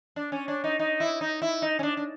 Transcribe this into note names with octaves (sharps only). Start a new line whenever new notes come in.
D4
C#4
D4
D#4
D#4
E4
D#4
E4
D#4
C#4
D4
D4